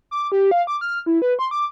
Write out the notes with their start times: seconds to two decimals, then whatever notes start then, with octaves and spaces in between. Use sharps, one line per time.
0.11 D6
0.32 G4
0.51 F5
0.67 D6
0.81 F6
1.06 E4
1.22 B4
1.39 C6
1.51 D6